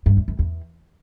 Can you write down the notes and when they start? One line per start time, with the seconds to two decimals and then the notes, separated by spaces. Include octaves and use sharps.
0.06 G2
0.17 E2
0.28 F#2
0.39 E2